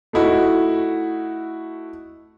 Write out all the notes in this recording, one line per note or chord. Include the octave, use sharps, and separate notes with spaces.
A3 D#4 E4 F#4